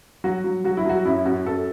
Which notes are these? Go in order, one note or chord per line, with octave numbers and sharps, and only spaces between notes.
F#3 F#4
F#3
F#3 F#4
E4
F#3 F#4
F#2 E4
F#2 F#4
F#2 A4